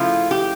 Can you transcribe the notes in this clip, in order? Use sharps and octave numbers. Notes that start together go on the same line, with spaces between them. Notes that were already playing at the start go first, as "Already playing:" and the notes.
Already playing: C#3 F3 A3 E4 F4
G4